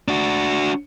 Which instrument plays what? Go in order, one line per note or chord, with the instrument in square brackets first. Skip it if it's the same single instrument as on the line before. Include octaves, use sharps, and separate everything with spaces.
[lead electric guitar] D4 F#4